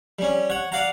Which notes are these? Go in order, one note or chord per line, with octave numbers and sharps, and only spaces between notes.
G3 C#4
C#5 F#5
D5 F5 F#5 A#5